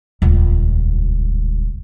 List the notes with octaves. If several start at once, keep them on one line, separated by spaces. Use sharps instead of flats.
D#1 C#2